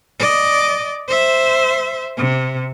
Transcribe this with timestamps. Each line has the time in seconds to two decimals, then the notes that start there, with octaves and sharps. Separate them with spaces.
0.20 D5 D#5
1.08 C5 E5
2.17 C3